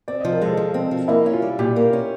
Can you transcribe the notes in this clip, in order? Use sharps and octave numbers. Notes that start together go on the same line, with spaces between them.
C4 D5
D#5
F3
A#4
G#3 A4
F3
C4
F3
A#3 E4
C#4
F4
G3
A#2 G4
A#3
C#4